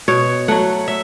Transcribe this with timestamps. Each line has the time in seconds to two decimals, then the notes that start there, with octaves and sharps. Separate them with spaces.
0.08 B2 C#5
0.48 F#3 A3 F#5
0.88 E5